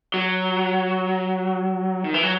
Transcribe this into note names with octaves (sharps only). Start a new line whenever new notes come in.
F#3
D#3
E3
F#3